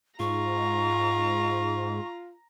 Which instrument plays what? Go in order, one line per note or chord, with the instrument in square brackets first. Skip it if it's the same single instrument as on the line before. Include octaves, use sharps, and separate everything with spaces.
[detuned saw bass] G#2 [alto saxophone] F4 [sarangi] A#5 [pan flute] C#6